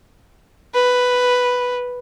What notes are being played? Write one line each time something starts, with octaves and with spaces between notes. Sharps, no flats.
B4